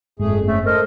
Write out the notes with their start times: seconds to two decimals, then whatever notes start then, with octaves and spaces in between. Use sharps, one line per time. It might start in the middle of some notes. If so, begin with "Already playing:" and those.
0.20 F#1 F2 G#2 A3 G#4
0.47 A3 C4 C#4 E5
0.66 A4 A#4 C5 D#5